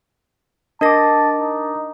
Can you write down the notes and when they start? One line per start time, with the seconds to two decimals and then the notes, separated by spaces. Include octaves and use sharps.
0.81 D4 A#4 D#5 A5 D6 A#6
1.39 D#4